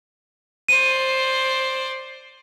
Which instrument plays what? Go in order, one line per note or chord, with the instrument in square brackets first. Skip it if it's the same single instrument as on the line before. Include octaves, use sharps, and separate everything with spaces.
[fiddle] C5 D5 [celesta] D#7